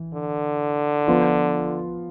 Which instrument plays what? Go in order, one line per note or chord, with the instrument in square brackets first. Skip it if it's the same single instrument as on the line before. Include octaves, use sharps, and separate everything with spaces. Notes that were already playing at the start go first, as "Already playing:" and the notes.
Already playing: [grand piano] E3
[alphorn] D3
[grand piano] F3 B3 F4 B4